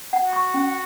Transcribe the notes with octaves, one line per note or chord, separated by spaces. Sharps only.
F#5
F#4
C#6
C#4